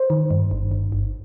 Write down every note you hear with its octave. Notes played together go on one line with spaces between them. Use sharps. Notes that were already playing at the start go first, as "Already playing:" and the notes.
Already playing: C5
D#3
G2
G1
G1
G1